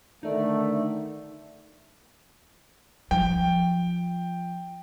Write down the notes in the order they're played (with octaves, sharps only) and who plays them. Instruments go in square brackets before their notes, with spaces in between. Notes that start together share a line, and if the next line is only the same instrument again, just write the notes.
[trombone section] D3 D#3 A3 [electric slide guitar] D#4 D5
[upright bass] F3 [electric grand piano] G5